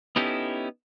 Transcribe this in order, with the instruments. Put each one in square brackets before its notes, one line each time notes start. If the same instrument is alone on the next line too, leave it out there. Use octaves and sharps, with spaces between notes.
[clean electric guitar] B3 C#4 D#4 E4 G4 A4